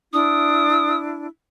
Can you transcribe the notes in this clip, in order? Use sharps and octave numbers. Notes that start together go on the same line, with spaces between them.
D4 E4 D#6